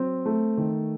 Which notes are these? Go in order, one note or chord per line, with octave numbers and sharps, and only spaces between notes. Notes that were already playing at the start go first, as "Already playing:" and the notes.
Already playing: F#3 C4
A3
D#3